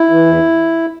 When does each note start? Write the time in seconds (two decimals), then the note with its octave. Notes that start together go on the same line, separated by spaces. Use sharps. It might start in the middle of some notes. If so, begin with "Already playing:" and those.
Already playing: E4
0.10 E3
0.26 E2